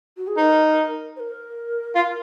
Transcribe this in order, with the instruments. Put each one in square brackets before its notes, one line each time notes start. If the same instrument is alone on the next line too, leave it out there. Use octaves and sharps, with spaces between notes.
[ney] F#4
G#4
[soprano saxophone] D#4 [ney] C5
[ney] A#4
C5
A#4
[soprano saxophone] F4